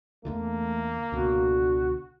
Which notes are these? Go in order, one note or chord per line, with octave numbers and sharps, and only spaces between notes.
E2 D3 E3 A3 A#3
C#2 B2 D3 F#4